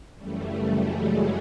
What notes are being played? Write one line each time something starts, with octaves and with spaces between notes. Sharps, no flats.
F#2 C#3 E3 G3 A3
F#3 G#3
G3